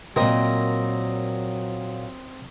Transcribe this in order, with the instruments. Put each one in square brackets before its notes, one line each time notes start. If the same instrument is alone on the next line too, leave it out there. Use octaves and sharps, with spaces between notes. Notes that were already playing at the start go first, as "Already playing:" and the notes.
[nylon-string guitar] A#2 A#4 [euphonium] F#3 [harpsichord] C4 D#5